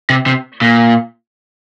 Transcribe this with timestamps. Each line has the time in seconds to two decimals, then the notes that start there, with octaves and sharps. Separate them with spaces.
0.10 C3
0.26 C3
0.62 A#2